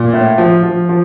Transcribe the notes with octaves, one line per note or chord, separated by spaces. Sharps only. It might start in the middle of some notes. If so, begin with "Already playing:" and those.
Already playing: A#2
A2
F3
F3
F3